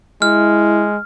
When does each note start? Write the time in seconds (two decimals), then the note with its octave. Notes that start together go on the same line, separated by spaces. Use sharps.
0.22 G#3 E4 F6